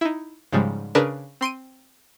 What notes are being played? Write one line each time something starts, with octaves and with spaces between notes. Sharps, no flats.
D#4 E4
G#2 C#3 F3 G3 G#3
C#3 D4 G#4 A#4 B4 E7
C4 C6 D7 D#7